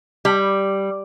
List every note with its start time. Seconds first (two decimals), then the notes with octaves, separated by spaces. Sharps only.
0.25 G3